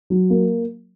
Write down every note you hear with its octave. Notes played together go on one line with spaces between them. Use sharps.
F#3
A#3